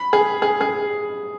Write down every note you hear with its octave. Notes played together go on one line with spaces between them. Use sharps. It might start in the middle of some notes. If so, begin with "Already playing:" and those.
Already playing: B5
G#4
G#4
G#4